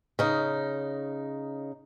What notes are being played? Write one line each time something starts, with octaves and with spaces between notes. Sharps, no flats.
C#3 D#4